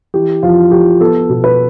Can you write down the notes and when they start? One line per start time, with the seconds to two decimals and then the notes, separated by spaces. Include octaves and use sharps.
0.14 E3 G4
0.43 F2 F4
0.71 F2 G4
1.01 B3 A4
1.29 B2
1.44 B4